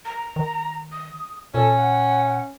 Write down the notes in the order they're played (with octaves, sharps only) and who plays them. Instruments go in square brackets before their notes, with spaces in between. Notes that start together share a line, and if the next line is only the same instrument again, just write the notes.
[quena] A#5
[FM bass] D#3
[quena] D#6
[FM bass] A#2 [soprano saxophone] C#4 [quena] A4
[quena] F#5